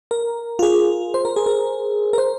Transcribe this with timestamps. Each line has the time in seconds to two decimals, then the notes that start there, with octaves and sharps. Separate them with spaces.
0.11 A#4
0.59 F4
0.63 G#4
1.14 C5
1.25 A#4
1.36 G#4
1.46 A#4
2.13 A#4
2.18 C5